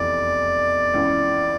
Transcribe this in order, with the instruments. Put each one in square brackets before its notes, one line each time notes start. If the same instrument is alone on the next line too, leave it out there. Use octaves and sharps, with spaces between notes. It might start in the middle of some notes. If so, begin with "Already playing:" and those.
Already playing: [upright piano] F1 E2 E3 [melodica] D5
[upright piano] C#2 C#3 E3